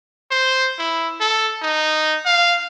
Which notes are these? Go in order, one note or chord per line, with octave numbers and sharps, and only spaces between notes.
C5
E4
A4
D#4
F5